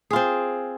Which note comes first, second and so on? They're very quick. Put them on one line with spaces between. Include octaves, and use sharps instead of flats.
G#4 F4 C4